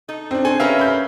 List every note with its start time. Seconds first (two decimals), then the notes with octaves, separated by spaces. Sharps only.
0.09 D#4 A4
0.31 C4 D4
0.45 A4 C5 G#5
0.60 C#4 G4 A#4 B4 E5 F5
0.79 B5 G6